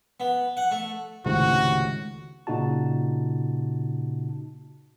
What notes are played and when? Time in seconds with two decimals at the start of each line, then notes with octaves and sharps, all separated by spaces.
0.20 B3
0.57 F#5
0.71 A3
1.26 C#2 A2 C3 D#3 F#4
2.47 A#2 C#3 D#4 F#4 A5